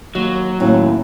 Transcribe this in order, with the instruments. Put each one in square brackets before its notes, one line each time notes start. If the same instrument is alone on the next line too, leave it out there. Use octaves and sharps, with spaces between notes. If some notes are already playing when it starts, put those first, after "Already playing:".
[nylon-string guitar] D#2 [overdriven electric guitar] F#3
[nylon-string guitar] D#2 A2 [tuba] C#4 [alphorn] E4